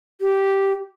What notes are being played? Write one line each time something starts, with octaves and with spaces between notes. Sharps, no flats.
G4